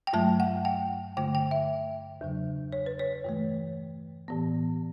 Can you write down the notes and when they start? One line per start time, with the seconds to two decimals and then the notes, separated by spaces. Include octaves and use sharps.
0.07 G5
0.13 G2 F#3 A3 A5
0.40 F#5
0.65 G5
1.17 G2 D3 A3 G5
1.35 G5
1.51 E5
2.21 E2 C#3 F#3
2.73 C#5
2.86 B4
3.00 C#5
3.24 G2 E3 A3
4.28 A2 E3 B3